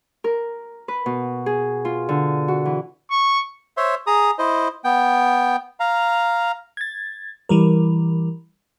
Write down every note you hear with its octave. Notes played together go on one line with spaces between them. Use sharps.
A#4
B4
B2
G#4
F4
D3
F#4
E3
C#6
C5 C#5 E5 C6
G#4 A#5 D#6
E4 C5 D#5
B3 G5
F5 A#5
G#6 A6
E3 G3 A#4